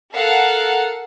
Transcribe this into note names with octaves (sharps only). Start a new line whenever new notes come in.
A4 A#4 F5 F#5